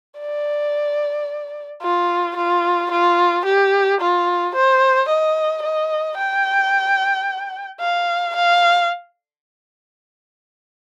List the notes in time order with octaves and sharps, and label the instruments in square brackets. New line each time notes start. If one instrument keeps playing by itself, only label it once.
[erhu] D5
F4
F4
F4
G4
F4
C5
D#5
D#5
G5
F5
F5